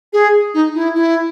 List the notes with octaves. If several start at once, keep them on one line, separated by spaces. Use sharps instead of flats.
G#4
D#4
E4
E4